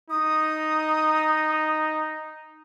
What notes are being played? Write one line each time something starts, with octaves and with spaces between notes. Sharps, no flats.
D#4 D#6